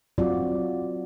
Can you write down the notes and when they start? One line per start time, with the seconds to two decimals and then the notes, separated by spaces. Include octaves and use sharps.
0.18 F#3 C4 F4 F#4 D5